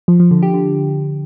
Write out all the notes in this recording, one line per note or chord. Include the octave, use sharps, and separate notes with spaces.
F3
F3
D3
G4
D3